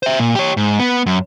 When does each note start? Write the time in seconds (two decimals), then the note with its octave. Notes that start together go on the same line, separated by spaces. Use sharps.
0.03 C5 E5
0.19 A#2
0.35 G4 C#5
0.57 G#2
0.80 B3
1.06 F#2